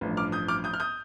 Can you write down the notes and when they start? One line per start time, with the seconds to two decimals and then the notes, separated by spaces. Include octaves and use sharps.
0.01 A1 G2 F3
0.17 D6 F6
0.32 D#6 G6
0.48 D6 F6
0.64 D#6 G6
0.74 F6
0.80 D#6 G6